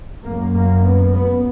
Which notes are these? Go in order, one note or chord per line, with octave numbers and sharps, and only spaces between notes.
F#2 A#3
A#3
B3
B3